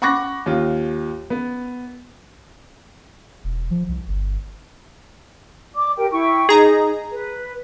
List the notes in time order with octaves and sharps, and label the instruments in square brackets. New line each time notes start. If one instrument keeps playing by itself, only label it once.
[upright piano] F#5 B5 C#6 D6 F#6 A#6
D#2 F4
B3
[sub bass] E1
F3
C2
G1
[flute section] D5 D6
G4 A#4 G5
E4 G5 C#6
[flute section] D#4 [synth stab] G#4 A#5
[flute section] B4